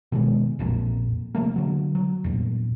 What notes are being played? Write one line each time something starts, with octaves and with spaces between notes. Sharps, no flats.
B2 D#3 F3 G#3
E1 A#1 F2 A#2
C3 F3 A3 A#3
D3 F#3
F#3
E2 A#2